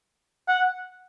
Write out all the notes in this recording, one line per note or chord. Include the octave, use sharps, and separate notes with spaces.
F#5